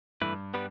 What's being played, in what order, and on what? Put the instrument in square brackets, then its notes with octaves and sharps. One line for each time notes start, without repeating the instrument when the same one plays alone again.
[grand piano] G2 [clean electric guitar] E3 A3 E4 B4
[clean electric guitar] G3 B3 G4 B4